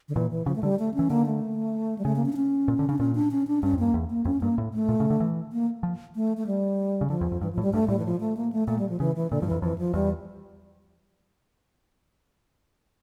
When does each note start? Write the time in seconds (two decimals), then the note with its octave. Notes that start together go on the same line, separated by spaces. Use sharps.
0.09 D3
0.15 A#2 E3
0.31 E3
0.46 C#3 F3
0.56 A3
0.63 D3 G3
0.79 A3
0.94 E3 C#4
1.10 D3 A#3
1.26 A3
1.98 G3
2.05 C#3 A3
2.16 A#3
2.26 C#4
2.33 D4
2.36 C#4
2.68 A#2
2.79 D3
2.89 C#3 D4
2.99 A#2 C#4
3.15 D4
3.31 C#4
3.47 D4
3.63 G2 C#4
3.73 F2
3.79 G2 A#3
3.94 E2
4.10 A#3
4.25 F2 C#4
4.41 G2 A#3
4.58 A2
4.73 A3
4.89 A#2
5.00 C#3
5.10 D3
5.20 E3
5.52 A#3
5.83 F3
6.15 A3
6.37 A3
6.47 G3
7.01 C#3
7.10 D3 F3
7.21 E2
7.32 F2
7.41 G2 E3
7.53 F3
7.58 A2
7.63 G3
7.73 G2 A3
7.88 A2 G3
7.99 E3
8.05 F3
8.20 A3
8.37 A#3
8.53 A3
8.68 A#2 A3
8.79 G3
8.89 F3
9.00 C#3 E3
9.16 E3
9.30 A#2 D3
9.42 G2 F3
9.47 F2 E3
9.62 F2 E3
9.78 F3
9.94 E2 G3